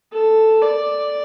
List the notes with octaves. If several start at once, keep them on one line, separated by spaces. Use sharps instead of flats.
A4
D5